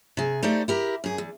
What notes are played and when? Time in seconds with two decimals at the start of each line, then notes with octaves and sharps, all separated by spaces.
0.17 C3 G#4
0.43 A3 D#4 G4 C5 D5
0.68 E4 G4 A#4
1.04 F#2 G#4
1.18 E2